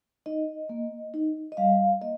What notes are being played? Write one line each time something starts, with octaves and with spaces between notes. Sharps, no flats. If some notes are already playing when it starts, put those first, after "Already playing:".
D#4 D#5
A#3
D#4
D#5
G3 F5
A#3 D#5